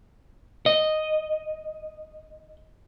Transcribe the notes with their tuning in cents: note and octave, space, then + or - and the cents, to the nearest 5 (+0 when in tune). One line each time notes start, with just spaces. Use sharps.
D#5 -5